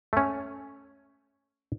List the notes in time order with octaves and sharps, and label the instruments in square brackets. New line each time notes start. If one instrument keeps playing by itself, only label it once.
[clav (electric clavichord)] A3 C#4